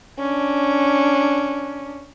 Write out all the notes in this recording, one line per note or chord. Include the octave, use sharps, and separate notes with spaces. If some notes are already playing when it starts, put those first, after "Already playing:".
C#4 D4